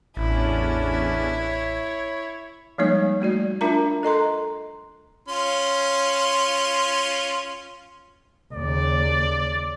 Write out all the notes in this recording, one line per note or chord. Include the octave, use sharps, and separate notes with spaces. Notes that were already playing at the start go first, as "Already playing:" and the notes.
A1 E2 C#4 D4 E4
C#5
F3 G3 G#3 A#3 D#4 C#5
G3 A3 F#4 D5
D4 F4 A#4 E5 A5 A#5
A4 D#5 A#5 C6
C#4 F4 C6
D#2 C#3 D5